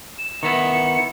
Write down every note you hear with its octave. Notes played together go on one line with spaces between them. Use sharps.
E7
D#3 B3 E4 C#7